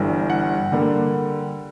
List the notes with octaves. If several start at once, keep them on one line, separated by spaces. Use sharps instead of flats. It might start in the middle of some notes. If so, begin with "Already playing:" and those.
Already playing: G1 G2 E3 G3
F#5
D3 G3 A#3